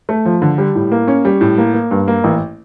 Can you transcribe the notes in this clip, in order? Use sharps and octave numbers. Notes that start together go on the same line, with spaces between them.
A3
F3
D3
G3
A2
A#3
C#4
G3
A2
A#3
A#3
G2
A#3
A1